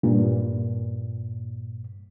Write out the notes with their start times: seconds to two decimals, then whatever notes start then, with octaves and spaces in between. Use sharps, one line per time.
0.03 G2 A#2